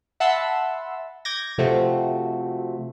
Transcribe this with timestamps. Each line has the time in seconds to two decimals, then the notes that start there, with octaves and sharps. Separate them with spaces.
0.20 E5 F#5 A5 B5 C6 E6
1.25 D6 G6 G#6 A#6
1.58 C3 F3 A3 C4 F#4